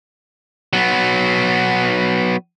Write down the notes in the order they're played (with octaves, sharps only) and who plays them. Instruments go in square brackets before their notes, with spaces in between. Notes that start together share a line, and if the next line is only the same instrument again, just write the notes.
[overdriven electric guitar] F#3 B3